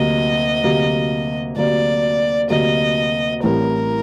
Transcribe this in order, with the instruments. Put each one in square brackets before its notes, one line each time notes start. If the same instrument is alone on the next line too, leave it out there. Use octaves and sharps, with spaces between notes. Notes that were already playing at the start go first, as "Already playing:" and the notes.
Already playing: [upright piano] D2 C3 F#3 A#3 [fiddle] D#5
[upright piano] D2 C3 F#3 A#3
[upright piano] D2 C3 F#3 A#3 [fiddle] D5
[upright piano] D2 C3 F#3 A#3 [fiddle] D#5
[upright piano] A1 A2 G3 C4 [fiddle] A#4